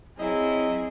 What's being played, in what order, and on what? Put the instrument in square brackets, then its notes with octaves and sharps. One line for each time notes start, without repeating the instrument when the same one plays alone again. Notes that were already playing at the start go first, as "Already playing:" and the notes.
[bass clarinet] F#3 [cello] C4 G#4 [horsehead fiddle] E4 [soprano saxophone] D#5